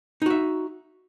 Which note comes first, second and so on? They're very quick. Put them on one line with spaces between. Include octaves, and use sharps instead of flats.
D#4 F#4 E5